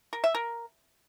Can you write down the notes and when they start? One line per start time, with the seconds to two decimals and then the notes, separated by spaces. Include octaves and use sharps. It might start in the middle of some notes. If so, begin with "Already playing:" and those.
0.13 A#4
0.24 E5
0.35 A#4